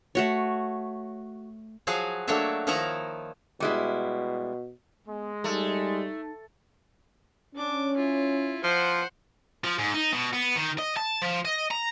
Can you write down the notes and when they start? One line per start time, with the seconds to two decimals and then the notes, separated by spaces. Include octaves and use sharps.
0.15 A3 F#4 C#5
1.87 F3 F#3 F#4 G#4 F5
2.28 F#3 A3 A#3 D4 C#5 E5
2.67 D#3 F3 D#4 E4 F#5 A#5
3.60 B2 G3 G#3 E4
5.07 G#3 B3
5.44 G3 A3 D#4
7.55 C#4 D4 D6
7.97 E4 F4
8.64 F3 C5 F#5
9.64 F3
9.79 G#2
9.94 D#4
10.13 B2
10.33 B3
10.56 D#3
10.78 D#5
10.97 A5
11.22 F3
11.45 D#5
11.71 A#5